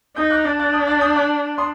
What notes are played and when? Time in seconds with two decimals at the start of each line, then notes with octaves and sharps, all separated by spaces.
0.16 D#4 D#6 G6
0.30 D6 F#6
0.45 D4 F#6 A6
0.59 F#6 A6
0.73 D#6 G6
0.87 F#6 A6
1.01 D#6 G6
1.15 D6 F#6
1.58 C6 D#6